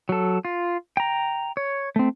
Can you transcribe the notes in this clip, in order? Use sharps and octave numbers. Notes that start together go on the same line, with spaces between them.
F#3 A4
F4
G5 A#5
C#5
A3 C4